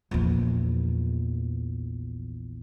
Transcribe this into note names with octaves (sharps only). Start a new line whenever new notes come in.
A#1 E2